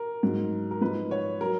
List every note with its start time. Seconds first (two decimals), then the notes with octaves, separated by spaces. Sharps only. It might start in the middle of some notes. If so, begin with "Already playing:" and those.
Already playing: A#4
0.23 G#2 F#3
0.71 A#4
0.81 G#2 F3 B4
1.11 C#5
1.41 F#3 A#4